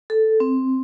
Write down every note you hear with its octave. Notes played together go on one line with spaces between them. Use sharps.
A4
C4